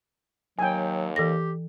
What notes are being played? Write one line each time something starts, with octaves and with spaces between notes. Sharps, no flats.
D#2 F#3 G5 G#5
E3 G4 A4 A#6